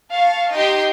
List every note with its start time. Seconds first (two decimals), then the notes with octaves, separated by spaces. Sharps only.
0.11 F5 A5 C#6
0.54 D#4 G4 D#5 G5 C6